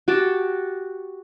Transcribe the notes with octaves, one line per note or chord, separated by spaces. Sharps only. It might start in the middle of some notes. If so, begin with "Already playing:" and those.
F#4 G4 G5 A5